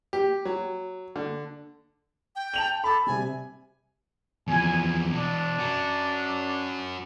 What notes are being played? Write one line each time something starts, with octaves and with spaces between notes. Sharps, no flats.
G4
F#3
D3
G5
A5 F7 F#7
A4 B5 D6
C3 G3 G#5
E2 F3 G#5
B2 E3 D4
C#4 F#4